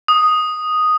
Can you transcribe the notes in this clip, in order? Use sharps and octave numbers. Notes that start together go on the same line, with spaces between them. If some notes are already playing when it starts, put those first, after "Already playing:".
D#6